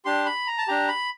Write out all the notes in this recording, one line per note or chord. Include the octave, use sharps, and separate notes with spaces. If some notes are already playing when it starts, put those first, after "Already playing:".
D4 G4 C6
B5
A#5
A5
D4 G4 A#5
B5